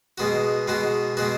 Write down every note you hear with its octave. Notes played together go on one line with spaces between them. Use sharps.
B2 G#3 B3 F#4
B2 G#3 B3 F#4
B2 G#3 B3 F#4